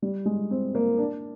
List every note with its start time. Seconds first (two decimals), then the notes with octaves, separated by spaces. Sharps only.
0.02 G3
0.25 G#3
0.51 C4
0.75 A#3
0.98 D4